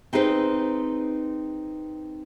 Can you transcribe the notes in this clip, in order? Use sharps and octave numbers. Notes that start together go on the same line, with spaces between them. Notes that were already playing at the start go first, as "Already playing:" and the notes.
C4 D#4 G#4 B4 C5